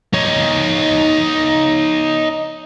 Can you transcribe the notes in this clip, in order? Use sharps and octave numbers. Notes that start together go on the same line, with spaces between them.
D#4 C#5